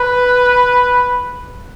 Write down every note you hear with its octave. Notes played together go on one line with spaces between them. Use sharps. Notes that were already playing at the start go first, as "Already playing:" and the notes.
Already playing: B4